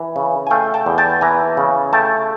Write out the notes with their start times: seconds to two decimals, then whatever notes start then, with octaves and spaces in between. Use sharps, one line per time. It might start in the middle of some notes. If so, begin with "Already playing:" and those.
Already playing: E3
0.16 C#3
0.47 G#5
0.51 A3 F5 G5
0.74 G5 A5
0.86 E2
0.98 G5 A5
1.21 E3 G#5 A#5
1.57 C#3
1.93 A3 G5 A5